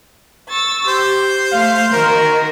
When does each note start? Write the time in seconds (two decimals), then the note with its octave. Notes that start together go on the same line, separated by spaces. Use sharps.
0.50 C#6 E6 A6
0.88 G4 C5
1.52 A3 F5
1.93 D#3 F#4 A#4